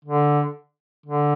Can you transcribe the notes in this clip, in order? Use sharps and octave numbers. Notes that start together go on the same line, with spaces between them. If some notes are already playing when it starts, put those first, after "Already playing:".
D3
D3